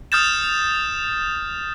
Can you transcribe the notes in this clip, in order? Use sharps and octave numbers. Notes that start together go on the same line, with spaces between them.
D#6 F6 G6 A6 E7